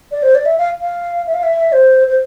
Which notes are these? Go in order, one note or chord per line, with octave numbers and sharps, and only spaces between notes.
D5
C5
D5
E5
F5
F5
E5
F5
E5
C5
C5